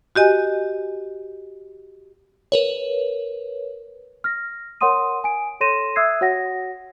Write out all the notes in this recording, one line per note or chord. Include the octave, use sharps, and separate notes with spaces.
F#4 G4 D#5 G#5
A#4 B4 C#5
F6 A#6
A#4 C#5 F#5 C6 D#6 D#7
G#5 D7
A4 C#5 C6 A#6 D#7 E7
E5 D#6 E6 F#6 G#6 C7
F#4 C#5 F#5 A#6